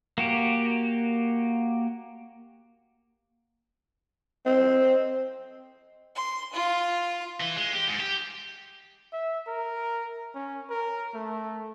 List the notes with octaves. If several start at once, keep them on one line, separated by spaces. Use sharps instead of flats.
A#3 F#4 G4
C4 D#5
C6
F4
E3
G#3
G4
G#2
G4
E5
A#4
C#4
A#4
A3